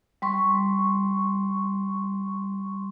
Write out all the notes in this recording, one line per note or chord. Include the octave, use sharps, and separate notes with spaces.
G3 C6 C#6